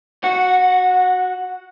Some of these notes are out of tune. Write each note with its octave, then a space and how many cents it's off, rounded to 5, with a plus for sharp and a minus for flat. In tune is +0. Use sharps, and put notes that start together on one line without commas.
F#4 +0 F#5 -20